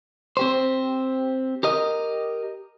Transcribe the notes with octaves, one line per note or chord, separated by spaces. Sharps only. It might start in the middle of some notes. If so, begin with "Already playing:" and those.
C4 G4 C5
G4 A#4 D#5